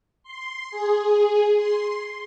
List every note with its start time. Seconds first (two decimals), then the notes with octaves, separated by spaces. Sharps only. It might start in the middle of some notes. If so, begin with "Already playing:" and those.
0.23 C6
0.71 G#4
1.56 C6